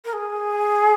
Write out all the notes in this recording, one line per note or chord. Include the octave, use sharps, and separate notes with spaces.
A#4
G#4